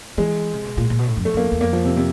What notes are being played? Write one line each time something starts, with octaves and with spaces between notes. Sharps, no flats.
E3 G#3
C3
B2
A#2
A#2
B2
A2
F#2
F2 A3
F#2 A#3
F2
E2
F2 A#3
F3
C3
C3